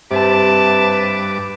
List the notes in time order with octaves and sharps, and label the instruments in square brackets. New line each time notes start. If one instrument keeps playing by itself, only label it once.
[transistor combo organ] G2 D6 [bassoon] C3 [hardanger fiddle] B4 A5